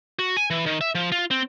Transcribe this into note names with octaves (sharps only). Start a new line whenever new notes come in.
F#4
G#5
E3
D#3
E5
F3
F4
C4